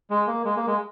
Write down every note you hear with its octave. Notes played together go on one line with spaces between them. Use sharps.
G#3
A#3
G#3
A#3
G#3